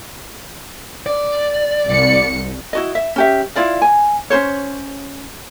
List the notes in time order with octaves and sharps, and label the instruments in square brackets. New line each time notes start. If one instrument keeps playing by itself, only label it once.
[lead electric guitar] D5
[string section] C2 C#7
[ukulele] E4 F#4 D#5
E5
C#4 G4 E5
E4 F4 D5 F5
G#5
C#4 F4 C5 C#5